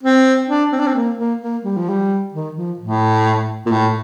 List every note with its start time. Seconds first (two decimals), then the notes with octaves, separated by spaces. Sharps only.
0.03 C4
0.48 D4
0.72 C4
0.79 D4
0.87 C4
0.94 A#3
1.18 A#3
1.41 A#3
1.63 G3
1.77 F3
1.89 G3
2.34 D#3
2.56 F3
2.79 A2
3.66 A#2
3.71 A2